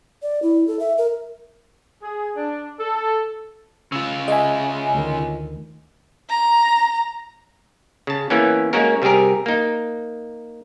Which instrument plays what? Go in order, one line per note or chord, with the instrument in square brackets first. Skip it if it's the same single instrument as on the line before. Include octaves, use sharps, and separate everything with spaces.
[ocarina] D5
E4
A4
E5
A#4
[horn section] G#4
D4
A4
[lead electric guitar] C#3 F4 [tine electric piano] E6
[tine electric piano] G#4 E5 [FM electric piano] D#5 G#5
[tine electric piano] D2 D#3
[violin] A#5
[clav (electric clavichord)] C#3 A5
E3 A#3 B3 C#4
G#3 A#3 C#4 F#4 A#4
C3 G3 G4 G#4 A#4
A#3 D#4